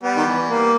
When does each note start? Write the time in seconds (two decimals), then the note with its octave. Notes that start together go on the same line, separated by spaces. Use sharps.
0.03 G3 B3
0.17 D#3
0.27 E3
0.49 G3 A#3